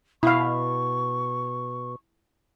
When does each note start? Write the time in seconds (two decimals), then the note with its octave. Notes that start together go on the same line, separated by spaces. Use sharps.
0.23 B2 E4 F5 C#6